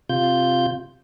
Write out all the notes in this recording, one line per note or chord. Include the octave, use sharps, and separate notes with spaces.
C3 F4 G6